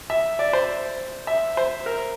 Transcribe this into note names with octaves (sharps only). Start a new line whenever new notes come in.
E5
D5
C5
E5
C5
A#4